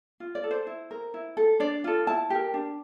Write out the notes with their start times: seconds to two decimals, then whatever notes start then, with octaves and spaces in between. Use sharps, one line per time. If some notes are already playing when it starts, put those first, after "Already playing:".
0.20 F4
0.35 D5
0.44 A4
0.51 C5
0.67 E4
0.91 A#4
1.14 E4
1.37 A4
1.60 D4 D5
1.84 F4 A4
2.07 E4 A5
2.30 G4 A#4
2.54 D4